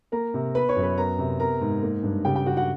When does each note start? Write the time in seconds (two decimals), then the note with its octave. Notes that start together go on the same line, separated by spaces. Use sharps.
0.12 A#3 A#4 A#5
0.34 C3
0.55 B3 B4 B5
0.69 C#5 C#6
0.76 F#2
0.83 B4 B5
0.97 B3 A#4 A#5
1.19 C3
1.39 B3 A#4 A#5
1.61 G#2
1.82 A#3
2.03 G2
2.25 C#3 G4 G5
2.35 G4 G5
2.46 C#3 F#4 F#5
2.57 F#4 F#5